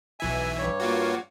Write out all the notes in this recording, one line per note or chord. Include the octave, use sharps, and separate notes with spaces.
B1 E3 E5 G#5
G2 C#5
A#3 F4 F#4